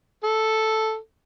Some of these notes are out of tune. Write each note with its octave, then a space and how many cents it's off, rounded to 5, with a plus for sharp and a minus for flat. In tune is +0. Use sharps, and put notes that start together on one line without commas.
A4 +0